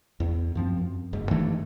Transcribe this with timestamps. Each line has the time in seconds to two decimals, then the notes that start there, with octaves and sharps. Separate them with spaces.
0.20 E2
0.55 F#2 F3 C4
0.78 F#2
1.13 F#1 G#2
1.31 G2 D#3 E3 A3